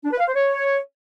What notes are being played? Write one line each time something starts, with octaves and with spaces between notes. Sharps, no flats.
D4
B4
F5
C5
C#5